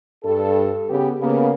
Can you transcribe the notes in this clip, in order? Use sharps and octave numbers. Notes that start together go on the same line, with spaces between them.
G2 A4
C#3 B3 G4
C#3 A#3 B3